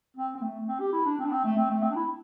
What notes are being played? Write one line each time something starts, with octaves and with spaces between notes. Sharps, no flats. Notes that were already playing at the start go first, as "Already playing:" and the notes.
C4
C4
A3
C4
G4
E4
D4
C4
D4
C4
A3
C4
A3
C4
D4
E4